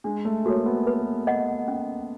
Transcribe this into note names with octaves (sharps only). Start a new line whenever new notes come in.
G#3 D4
A3
A#3 F#4 A4 C#5
B3
B4
D#5 F#5
C#4